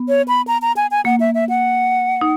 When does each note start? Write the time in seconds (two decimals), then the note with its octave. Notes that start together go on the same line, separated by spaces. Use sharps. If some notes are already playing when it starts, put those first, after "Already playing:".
Already playing: B3
0.09 C#5
0.28 B5
0.47 A#5
0.62 A#5
0.77 G#5
0.91 G#5
1.05 A#3 F#5
1.20 E5
1.34 E5
1.49 F#5
2.21 D#4